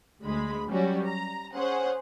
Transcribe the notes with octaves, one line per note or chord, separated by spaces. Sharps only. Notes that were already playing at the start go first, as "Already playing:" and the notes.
D2 G#3 B5
F#3 G3 C#4 F#4
A#5
C#4 G#4 C5 F#5